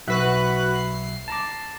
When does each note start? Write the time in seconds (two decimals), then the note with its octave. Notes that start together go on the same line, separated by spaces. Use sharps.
0.08 B1 F#4 B4 E5 F#6
0.75 C7
1.28 A5 A#5 D6